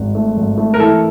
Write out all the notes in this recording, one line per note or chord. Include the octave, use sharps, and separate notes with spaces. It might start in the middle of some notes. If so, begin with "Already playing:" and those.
Already playing: G#1
A3
G#1
A3
A#4
E3 A4